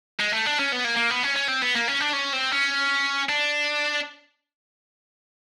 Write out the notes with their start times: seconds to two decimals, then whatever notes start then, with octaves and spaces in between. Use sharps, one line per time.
0.20 G#3
0.32 A3
0.46 D4
0.59 C#4
0.72 B3
0.85 A#3
0.97 A#3
1.11 B3
1.24 C#4
1.37 C#4
1.48 C4
1.62 B3
1.75 A#3
1.88 C#4
2.01 D4
2.13 C#4
2.33 C4
2.52 C#4
3.29 D4